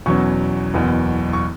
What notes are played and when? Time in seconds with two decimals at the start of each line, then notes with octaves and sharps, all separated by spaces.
0.06 E2 B2 F#3 C#4 C#6
0.74 F#1 E2 B2
1.33 C#6